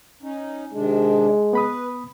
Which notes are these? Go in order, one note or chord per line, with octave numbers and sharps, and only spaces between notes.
C#4 D#4
C3 D#3 G#3 D4
B3 B4 B5 D#6